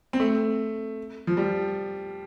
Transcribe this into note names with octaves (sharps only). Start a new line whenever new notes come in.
C4
A3
F3
G3